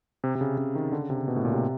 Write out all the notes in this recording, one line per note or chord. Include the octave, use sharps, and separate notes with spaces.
C3
C3
C#3
C#3
D#3
D3
C#3
C3
C#3
B2
A2
A#2
C3